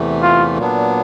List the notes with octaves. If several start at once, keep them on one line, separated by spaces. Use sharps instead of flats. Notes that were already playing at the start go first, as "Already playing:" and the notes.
Already playing: E2 C3 E3 A3
F4
A#2 F#3 B3 D4